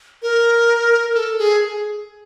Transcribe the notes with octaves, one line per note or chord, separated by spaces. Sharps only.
A#4
A4
G#4